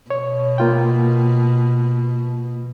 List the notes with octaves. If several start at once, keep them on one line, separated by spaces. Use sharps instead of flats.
B2 C#5
A#3 F4 G5